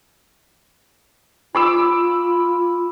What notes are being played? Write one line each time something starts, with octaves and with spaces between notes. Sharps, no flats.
F4 B5 D6 E6